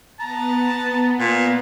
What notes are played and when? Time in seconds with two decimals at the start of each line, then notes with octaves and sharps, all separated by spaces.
0.20 B3 A5 A#5
1.19 A#2